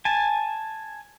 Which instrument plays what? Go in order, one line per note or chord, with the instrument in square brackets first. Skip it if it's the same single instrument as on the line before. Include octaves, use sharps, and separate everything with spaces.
[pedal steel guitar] G#5 A5